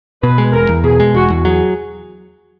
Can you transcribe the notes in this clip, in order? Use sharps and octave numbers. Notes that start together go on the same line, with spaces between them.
B2 B4
G#3
E1 A#4
E2
B2 G#4
G#3
E1 F#4
E2
F#3 G#4